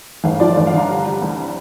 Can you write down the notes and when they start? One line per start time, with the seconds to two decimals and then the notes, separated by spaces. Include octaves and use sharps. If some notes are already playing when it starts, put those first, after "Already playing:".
0.24 G1 F5
0.40 F3 D5
0.56 G1 D5
0.67 F5
0.73 D3 A#5
0.89 G3
1.06 G3
1.22 C2